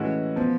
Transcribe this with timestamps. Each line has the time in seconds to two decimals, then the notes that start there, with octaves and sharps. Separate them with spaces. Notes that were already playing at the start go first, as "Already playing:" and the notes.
Already playing: A2 E3 G#3 C#4 F#4
0.36 F3 B3